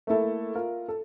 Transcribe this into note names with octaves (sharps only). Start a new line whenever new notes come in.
A3 A#3 E4 A4
F4 A#4
A4